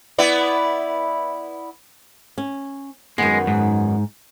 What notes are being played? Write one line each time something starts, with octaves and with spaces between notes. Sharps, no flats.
B3 E4 D5
C#4
F#2 D#3 G#3 B3
G#2